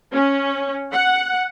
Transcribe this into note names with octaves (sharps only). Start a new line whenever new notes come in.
C#4
F#5